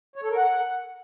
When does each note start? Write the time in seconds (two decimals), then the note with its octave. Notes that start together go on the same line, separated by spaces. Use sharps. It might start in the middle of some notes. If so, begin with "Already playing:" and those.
0.16 C#5
0.23 A4
0.30 A#4
0.37 F#5